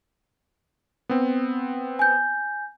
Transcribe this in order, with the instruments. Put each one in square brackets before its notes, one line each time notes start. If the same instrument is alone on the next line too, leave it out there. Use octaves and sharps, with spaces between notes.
[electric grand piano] B3 C4
[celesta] G#5 G6